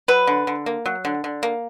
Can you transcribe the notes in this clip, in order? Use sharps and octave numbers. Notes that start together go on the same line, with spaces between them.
F#3 B4
D3
D3
A#3
F#3
D3
D3
A#3